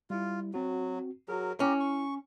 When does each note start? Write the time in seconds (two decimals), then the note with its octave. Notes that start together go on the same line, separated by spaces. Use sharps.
0.10 G3 E4 F4
0.54 F#3 C4 F#4
1.28 F#3 F#4 G#4 A#4
1.60 C#4 E4 G4 A#5
1.80 C#6